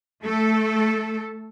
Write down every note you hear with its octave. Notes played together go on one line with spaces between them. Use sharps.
A3 A4